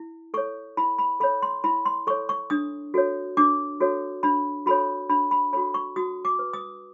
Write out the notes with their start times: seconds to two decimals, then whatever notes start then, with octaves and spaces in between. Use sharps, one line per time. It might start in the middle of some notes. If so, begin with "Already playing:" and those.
Already playing: E4
0.34 A4 C#6
0.37 C#5
0.77 E4 B5
0.99 B5
1.20 A4 B5
1.23 C#5
1.42 C6
1.64 E4 B5
1.85 C6
2.07 A4 C#5 C#6
2.29 C#6
2.50 D4 D#6
2.94 F#4 A4 C#5
3.37 D4 D6
3.80 F#4 A4 C#5
4.23 D4 B5
4.66 F#4 A4 C#5 B5
5.10 D4 B5
5.31 B5
5.53 F#4 A4 C#5 B5
5.74 C#6
5.96 F#4 D#6
6.25 D6
6.39 B4
6.53 D#6